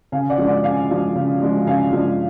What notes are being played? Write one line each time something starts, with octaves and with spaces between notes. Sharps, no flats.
C#3 F5 G#5
D5 F#5
F3 G#3 D4
D5 F#5
C#3 F5 G#5
F3 G#3 D4
C#3
F3 G#3 D4
C#3 F5 G#5
F3 G#3 D4